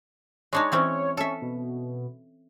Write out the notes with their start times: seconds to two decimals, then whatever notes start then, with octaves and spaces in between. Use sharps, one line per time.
0.53 G#3 D4 D#4 C#5
0.72 E3 C4 C#4
1.17 C#4 A4 E5
1.42 B2